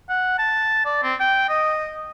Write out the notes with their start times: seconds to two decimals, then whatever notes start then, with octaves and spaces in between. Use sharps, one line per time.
0.09 F#5
0.39 A5
0.86 D5
1.03 C4
1.20 G5
1.49 D#5